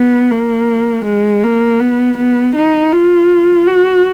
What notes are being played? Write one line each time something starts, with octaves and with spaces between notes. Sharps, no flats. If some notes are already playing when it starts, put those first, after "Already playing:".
Already playing: B3
A#3
G#3
A#3
B3
B3
D#4
F4
F#4